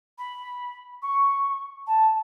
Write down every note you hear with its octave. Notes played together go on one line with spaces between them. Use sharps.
B5
C#6
A5